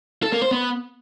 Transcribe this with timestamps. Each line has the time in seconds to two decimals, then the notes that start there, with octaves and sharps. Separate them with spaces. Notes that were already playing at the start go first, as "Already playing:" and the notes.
0.23 A4
0.32 A#3
0.42 C5
0.51 B3